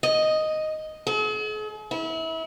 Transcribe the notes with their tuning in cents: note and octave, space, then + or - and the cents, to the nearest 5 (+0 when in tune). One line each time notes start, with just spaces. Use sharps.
D#5 +0
G#4 +45
E4 -30